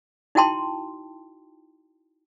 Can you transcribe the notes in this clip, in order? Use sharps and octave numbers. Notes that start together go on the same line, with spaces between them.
D#4 E4 F#4 G5 A5 C6